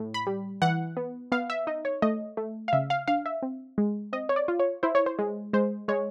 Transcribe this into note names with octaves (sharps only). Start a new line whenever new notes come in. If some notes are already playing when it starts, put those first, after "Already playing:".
Already playing: A2
B5
G3
E3 F#5
B3
B3 F5
E5
D#4 D#5
C#5
A3 D#5
A3
F5
C#3 E5
F5
D4 F5
E5
C4
G#3
C4 D#5
C#5
D5
F4
C#5
E4 C5
C#5
C5
G#3
G#3 C5
G#3 C#5